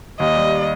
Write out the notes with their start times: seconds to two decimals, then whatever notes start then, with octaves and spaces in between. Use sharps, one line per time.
0.20 D#2 D#5
0.36 G3